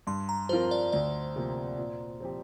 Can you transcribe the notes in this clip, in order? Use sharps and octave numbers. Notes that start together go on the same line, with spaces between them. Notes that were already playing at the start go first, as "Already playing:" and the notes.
G2 C6
A#5
F3 C4 F4 A#4 C5
D5
D2 D5
C3 F3 A#3
A#2
F3 C4 G4